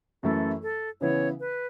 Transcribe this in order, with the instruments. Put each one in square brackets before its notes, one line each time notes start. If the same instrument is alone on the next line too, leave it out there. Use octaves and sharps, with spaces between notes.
[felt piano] F#2 E3 A3 E4 [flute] A4
[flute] A4
[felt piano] C#3 E3 B3 E4 [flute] C#5
[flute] B4